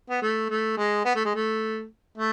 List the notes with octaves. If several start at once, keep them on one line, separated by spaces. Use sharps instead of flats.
B3
A3
A3
G#3
B3
A3
G#3
A3
A3